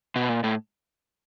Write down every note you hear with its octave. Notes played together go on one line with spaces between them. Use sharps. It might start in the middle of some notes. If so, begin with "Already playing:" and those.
B2
A#2
A2